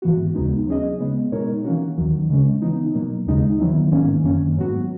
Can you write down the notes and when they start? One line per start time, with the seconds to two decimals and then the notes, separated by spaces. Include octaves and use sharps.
0.02 G#2 E3 B3 F#4
0.35 D#2 C#3 G#3 B3 D#4
0.67 F#3 C#4 G#4 D#5
1.00 C#3 G#3 B3
1.32 B2 G#3 D#4 A#4 C#5
1.64 E3 A#3 C#4 F#4
1.97 D#2 D#3 F#3
2.29 C#3 G#3 C#4
2.62 E3 B3 D#4
2.94 B2 F#3 A#3
3.27 D#2 C#3 G#3 D#4
3.59 D#3 F#3 B3 E4
3.91 G#2 D#3 A#3 C#4
4.24 F#2 D#3 A#3 C#4
4.56 G#2 F#3 B3 F#4